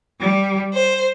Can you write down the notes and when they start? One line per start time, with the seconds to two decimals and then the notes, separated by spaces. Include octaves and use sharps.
0.19 G3
0.73 C5